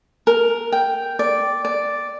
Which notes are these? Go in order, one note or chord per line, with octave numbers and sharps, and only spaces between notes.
A#4
G5
D5
D5